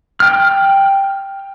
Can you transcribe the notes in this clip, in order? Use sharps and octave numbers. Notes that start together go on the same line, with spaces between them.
G5 F6